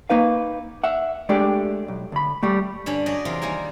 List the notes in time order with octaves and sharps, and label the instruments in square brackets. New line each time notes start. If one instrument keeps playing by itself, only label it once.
[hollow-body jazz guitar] A#3 D#4 B4 F5
E5 F#5
G#3 A3 D4 G4 D5
B1
D2 B5
G3 A3
[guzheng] G2 D3 C#4 B5
F#3 G#4 D5 D#5
E2 C3 F4 A#4
D#3 G3 A#3 G#5 A#5